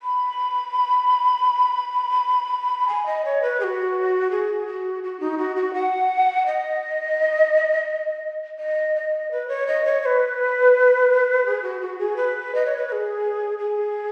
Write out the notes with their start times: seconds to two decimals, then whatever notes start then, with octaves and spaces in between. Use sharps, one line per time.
0.03 B5
2.88 G#5
3.06 D#5
3.25 C#5
3.42 B4
3.60 G#4
3.64 F#4
4.31 G#4
4.67 F#4
5.03 F#4
5.20 D#4
5.38 F#4
5.56 F#4
5.74 F#5
6.46 D#5
8.59 D#5
8.96 D#5
9.32 B4
9.48 C#5
9.67 D#5
9.85 C#5
10.02 C#5
10.06 B4
11.46 G#4
11.62 F#4
11.81 F#4
11.99 G#4
12.17 B4
12.55 D#5
12.66 C#5
12.77 B4
12.88 B4
12.92 G#4
13.59 G#4